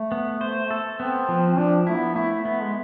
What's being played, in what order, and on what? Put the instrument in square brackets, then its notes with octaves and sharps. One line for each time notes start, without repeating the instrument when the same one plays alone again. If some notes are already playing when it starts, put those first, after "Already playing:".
Already playing: [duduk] A3
[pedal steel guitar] B3
C5
A4
[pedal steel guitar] B3 [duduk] C4
[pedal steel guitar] F3
[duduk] C4
[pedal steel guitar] F3 [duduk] D4
[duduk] A3 [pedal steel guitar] E4
[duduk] B3
[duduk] A3 [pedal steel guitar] E4
[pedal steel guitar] B3
[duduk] G#3